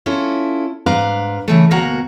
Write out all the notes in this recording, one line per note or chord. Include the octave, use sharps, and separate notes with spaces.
C#4 E4 F4 A4
G#2 D4 B4 F5 A#5
C#3 E3 A3
D2 B2 A#3 F#4 F#5 A#5